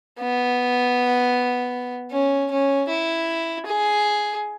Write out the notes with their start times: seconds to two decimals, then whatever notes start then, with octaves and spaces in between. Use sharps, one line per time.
0.20 B3
2.11 C#4
2.51 C#4
2.88 E4
3.66 G#4